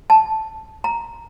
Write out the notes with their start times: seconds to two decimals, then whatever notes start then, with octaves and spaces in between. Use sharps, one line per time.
0.10 A5
0.84 A#5